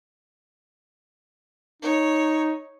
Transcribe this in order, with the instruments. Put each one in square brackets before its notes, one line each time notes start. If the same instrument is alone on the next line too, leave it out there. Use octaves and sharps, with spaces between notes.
[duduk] D#4 [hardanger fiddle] C#5